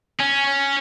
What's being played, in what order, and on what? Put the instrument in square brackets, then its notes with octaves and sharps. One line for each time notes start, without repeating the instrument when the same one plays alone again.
[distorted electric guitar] C#4